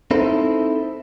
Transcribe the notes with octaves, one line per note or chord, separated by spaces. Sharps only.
C4 D#4 E4 A4 C5